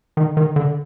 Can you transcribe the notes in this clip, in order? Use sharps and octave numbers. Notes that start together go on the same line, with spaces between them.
D#3
D#3
D3